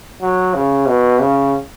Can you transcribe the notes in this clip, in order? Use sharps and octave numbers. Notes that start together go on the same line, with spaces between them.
F#3
C#3
B2
C#3